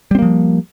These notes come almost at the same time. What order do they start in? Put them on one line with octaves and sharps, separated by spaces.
G3 C4 A#3 F3